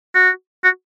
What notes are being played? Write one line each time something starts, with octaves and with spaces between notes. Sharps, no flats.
F#4
F#4